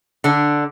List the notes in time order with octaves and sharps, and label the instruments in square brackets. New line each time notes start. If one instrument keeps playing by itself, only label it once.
[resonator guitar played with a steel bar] D3 D4